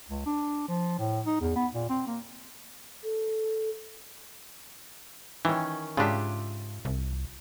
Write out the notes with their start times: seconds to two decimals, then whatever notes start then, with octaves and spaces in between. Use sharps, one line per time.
0.09 C#2
0.26 D4
0.68 F3
0.99 A2
1.26 D#4
1.41 E2
1.56 B3
1.74 A#2
1.90 C4
2.07 A#3
3.03 A4
5.45 D#3 E3 C#4
5.97 G#2 C#3 D4 F4 G4 E5
6.85 C2